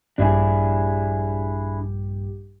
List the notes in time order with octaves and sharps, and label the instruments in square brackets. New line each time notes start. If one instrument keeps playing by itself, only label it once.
[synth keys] A#1 G2 G4 [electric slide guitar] D4 E4 G#4